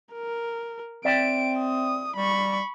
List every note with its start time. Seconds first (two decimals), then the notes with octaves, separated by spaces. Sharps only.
0.14 A#4
1.05 C4 D5 E5 G5 D7
1.59 D#6
2.16 G3 B5 C#6